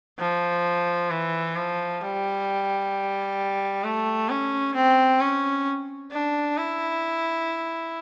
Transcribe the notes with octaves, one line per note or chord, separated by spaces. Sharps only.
F3
E3
F3
G3
A3
C#4
C4
C#4
D4
E4